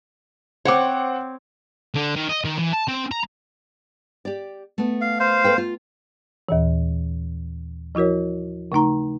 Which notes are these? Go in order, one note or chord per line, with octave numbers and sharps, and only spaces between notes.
C4 C5 C#5 F#5 D6
D3
D#3
D#5
D#3
E3
A5
C4
A#5
G4 D5
A3 B3
F5
C5 F5
A4 B4 G5
F4
D#2 A#2 E3
F3 E4 F#4 A#4 C#5
C#3 A3 D#4 A#5